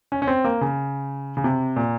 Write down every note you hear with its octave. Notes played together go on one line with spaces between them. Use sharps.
C#4
C#4
C4
A#3
C#3
C#3
C3
A#2